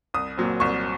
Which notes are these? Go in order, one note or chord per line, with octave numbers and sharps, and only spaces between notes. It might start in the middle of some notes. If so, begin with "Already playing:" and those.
C2 D#6
A#2 F#3 C4
C2 C#6